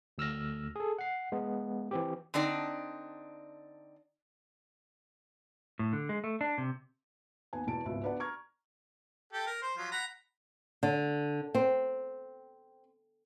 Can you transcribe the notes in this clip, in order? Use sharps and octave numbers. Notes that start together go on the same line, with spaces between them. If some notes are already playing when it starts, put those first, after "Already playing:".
D2 E6 F6 A#6
G#4 A4
F#5 C7
G#3 B3
E3 C4 G4
D3 C4 D4 D#4 D5
A2
D3
G#3
A3
D4
C3
D#2 B3 B4 G#5
E1 E2 B2 A5 D7
G#1 C#2 B2 E5
B3 D4 F#4 B4 D5 F#5
A#5 C#6 F6 G#6
G4 A4
A#4
C5
F3 F#3 F4
F#5 A#5 B5
D3
C4